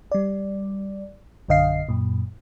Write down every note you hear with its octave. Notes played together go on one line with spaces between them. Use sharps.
G3 D5
A#1 F#2 D3 D#5 F5 C7
F#2 A#2